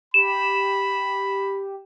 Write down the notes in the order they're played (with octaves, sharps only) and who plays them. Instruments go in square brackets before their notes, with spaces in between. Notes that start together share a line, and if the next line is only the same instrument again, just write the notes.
[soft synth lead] G4 [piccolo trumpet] B5 [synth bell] E7